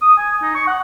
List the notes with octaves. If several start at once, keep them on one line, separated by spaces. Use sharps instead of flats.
D#6
G#5
D#4
C#6
F#5